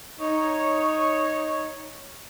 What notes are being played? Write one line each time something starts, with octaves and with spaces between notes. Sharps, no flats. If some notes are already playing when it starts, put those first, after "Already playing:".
D#4 C#5